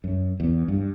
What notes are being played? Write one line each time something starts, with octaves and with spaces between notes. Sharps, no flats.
F#2
E2
G2